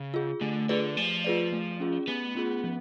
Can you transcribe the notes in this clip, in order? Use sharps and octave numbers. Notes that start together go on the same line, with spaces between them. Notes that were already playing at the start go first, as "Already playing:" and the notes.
Already playing: C#3
F4 G#4
D3 A3
D3 F4 G#4 B4 D5
F3 A3
F4 G#4 B4 D5
A3
C#4 F4 G#4
A3 B3
C#4 F4 G#4
F3